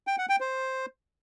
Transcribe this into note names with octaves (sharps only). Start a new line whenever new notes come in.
G5
F#5
G5
C5